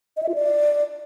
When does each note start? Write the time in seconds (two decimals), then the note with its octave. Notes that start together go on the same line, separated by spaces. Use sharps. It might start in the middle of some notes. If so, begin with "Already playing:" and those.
0.17 D#5
0.23 E5
0.29 F4
0.35 D5